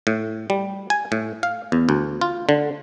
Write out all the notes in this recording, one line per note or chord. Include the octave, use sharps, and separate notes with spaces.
A2
G3
G#5
A2
F5
E2
D2
F4
D3